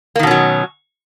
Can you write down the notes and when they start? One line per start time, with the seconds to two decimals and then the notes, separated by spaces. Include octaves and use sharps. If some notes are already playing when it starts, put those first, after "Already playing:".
0.16 A#3
0.19 D#3
0.23 B2
0.27 C#4
0.31 F#3